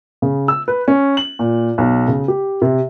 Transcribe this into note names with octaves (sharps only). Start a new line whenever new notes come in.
C#3
E6
B4
C#4
F#7
A#2
B1
C#3
G4
C3